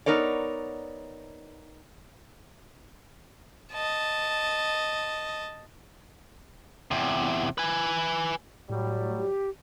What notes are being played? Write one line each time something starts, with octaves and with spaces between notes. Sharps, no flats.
B3 D#4 A#4 C#5 D5
D#5 A5
E2 C3
B4 G#5
A2 F#3 G3
G4